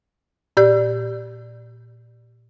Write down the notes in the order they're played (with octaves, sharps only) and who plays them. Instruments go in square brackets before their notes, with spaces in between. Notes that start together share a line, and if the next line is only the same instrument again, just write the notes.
[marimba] A#2 G4 D5 G6